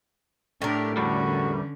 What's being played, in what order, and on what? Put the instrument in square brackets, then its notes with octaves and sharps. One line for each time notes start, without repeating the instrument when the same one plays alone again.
[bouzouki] A2 A#4 [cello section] D4 G4
[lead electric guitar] E2 G3 [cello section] D3 C#4 [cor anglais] F#4